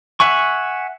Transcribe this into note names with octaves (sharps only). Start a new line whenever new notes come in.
E5 F#5 G#5 C#6